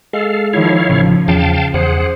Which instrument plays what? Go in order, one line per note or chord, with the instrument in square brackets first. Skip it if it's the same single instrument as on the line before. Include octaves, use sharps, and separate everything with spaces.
[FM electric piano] G#3 [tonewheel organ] A4 F5
[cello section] D#3 F3 [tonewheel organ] E4 C#5 F5
[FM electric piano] A1 [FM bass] C#3 [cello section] F3
[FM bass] E2 [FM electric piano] C#3 [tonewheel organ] F5 G5 A5
[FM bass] E2 [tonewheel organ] G#4 F#5 [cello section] C5